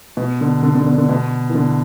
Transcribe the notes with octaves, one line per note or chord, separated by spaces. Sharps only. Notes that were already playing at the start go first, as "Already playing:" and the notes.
B2
D3
D3
D3
D3
D3
B2
E3
D3